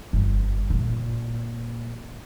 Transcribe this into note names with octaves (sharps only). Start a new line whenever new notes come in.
G1
A#2